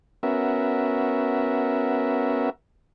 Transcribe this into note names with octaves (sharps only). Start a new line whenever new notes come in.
B3 C#4 F#4 A#4 E5